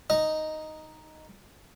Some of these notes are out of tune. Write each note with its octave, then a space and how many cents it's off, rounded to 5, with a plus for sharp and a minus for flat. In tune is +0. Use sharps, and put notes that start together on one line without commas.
D#4 +0 D#5 +0